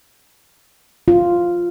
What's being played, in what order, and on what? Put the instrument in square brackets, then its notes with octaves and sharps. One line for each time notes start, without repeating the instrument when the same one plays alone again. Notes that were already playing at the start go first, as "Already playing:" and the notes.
[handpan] F4